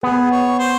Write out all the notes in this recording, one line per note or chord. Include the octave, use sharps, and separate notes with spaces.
B3 G#4
C#5
C5